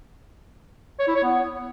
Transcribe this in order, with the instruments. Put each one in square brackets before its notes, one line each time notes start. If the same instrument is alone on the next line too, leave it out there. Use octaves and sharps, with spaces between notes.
[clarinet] C#5
E4
C#5
B3